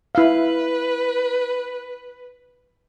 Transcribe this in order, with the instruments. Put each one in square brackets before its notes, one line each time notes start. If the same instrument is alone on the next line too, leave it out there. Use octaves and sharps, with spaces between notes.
[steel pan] E4 F5 [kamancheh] B4